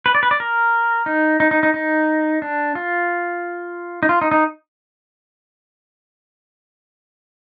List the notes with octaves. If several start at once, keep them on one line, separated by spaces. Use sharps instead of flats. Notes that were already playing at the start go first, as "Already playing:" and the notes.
B4
D5
B4
D5
A#4
D#4
D#4
D#4
D#4
D#4
D4
F4
D#4
F4
D#4
D#4